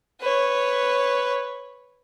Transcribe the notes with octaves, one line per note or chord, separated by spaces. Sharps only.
B4 C#5